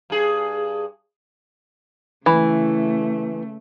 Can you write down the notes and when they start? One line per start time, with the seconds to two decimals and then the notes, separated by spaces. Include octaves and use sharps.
0.10 G2 G#4
2.26 C#3 E3 A3